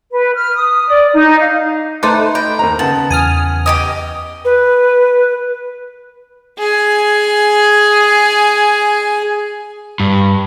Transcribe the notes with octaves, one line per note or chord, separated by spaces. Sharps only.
B4
F6
D#6
D5
D#4
F5
A3 D#4 B4 C5 A5 D6
D#5 G5 B5
D#2 C5 A#5
C#3 B3 A5 F#7
E2 G#5 D#6 F6
G4 A#4 D#5
B4
G#4 G#5
G2